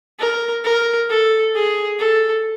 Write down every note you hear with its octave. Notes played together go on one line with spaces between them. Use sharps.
A#4
A#4
A4
G#4
A4